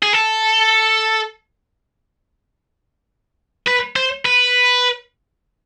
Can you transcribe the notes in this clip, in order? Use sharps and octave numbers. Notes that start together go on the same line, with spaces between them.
G#4
A4
B4
C5
B4